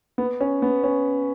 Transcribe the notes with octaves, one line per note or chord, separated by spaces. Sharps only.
B3
C#4
B3
C#4